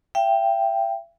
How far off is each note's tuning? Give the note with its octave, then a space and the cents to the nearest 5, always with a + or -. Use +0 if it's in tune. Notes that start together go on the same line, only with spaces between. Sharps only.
E5 +40 G5 +0